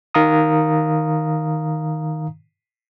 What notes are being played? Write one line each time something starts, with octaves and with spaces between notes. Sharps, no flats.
D#3 F5 A#5 D#6